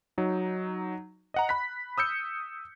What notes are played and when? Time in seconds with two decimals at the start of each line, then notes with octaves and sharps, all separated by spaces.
0.18 F#3 D#4
1.34 D#5 F#5 A#5
1.49 B5 F#6 B6
1.98 D#6 E6 G6 C#7